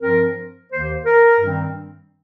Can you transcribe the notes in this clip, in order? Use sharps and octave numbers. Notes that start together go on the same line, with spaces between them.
G2 F3 C4 A#4
D#2 D#3 A#3 C5
A#4
G2 D#3 G3 C4